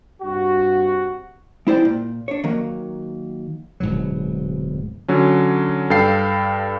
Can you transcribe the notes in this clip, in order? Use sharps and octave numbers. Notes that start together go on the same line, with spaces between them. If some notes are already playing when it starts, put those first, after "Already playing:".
G2 C3 F#4
G#3 E4 C5 D5 G5
A#2
D4 C#5
D#3 F#3 A#3
D1 G#2 B2 F#3
D3 F#3 C#4
G2 A4 F5 G5 C7